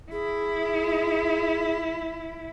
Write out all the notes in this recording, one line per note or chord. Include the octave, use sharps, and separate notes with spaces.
E4 G#4